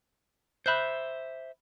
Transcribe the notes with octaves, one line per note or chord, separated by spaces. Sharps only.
C5 E5 B5 F#6 G6